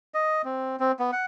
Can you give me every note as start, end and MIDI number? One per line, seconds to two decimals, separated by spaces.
0.14 0.42 75
0.45 0.76 60
0.80 0.92 60
0.99 1.11 59
1.12 1.26 78